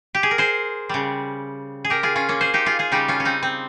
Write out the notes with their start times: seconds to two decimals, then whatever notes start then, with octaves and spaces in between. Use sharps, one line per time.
0.15 G4
0.23 G#4
0.31 A#4
0.38 G#4 C5
0.89 C#3 G3
1.85 G#4
1.90 G4 A#4
2.03 F4 G#4
2.16 C#4 F4
2.29 A#3 C#4
2.41 G#4 C5
2.54 D#4 G4
2.66 F4 G#4
2.79 F4 G#4
2.92 C#3 G3 D#4 G4
3.08 C#4 F4
3.20 C#4
3.25 C4 D#4
3.43 C4